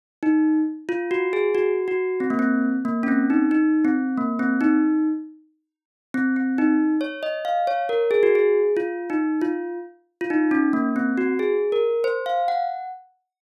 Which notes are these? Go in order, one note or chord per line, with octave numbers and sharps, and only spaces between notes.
D#4
F4
F#4
G#4
F#4
F#4
C4
A#3
C4
A#3
C#4
C4
D#4
D#4
C4
A#3
C4
D#4
C4
C4
D#4
C#5
D#5
F5
C#5
A#4
G#4
F#4
G#4
F4
D#4
F4
F4
D#4
C#4
A#3
C4
F#4
G#4
A#4
C5
F5
F#5